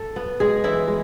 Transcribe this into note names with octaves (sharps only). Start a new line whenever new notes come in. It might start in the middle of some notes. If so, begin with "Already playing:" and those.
Already playing: A4
B3
G#3 G#4
E3 E4
G#3